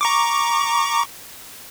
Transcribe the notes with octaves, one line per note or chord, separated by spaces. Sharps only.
A#5 C#6 D6